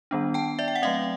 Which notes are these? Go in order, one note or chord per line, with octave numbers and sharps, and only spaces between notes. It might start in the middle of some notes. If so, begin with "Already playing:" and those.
D#3 G3 B3 D4
G5 A5
D5 E5
G5
F#5
F#3 A3 C4 D#5 F5